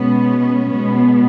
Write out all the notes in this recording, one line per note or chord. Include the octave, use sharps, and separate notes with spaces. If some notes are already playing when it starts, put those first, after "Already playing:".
Already playing: B2 G#3 B3 C#4
B2 G#3 B3